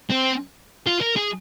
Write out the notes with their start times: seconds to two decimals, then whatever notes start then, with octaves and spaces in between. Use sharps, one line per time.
0.11 C4
0.87 F4
1.01 A#4
1.16 G#4